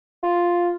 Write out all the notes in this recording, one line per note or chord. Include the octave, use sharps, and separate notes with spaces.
F4